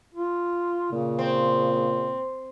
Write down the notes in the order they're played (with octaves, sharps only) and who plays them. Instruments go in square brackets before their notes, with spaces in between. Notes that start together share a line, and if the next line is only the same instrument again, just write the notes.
[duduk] F4
[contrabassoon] A#2 [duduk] C#3
[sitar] C4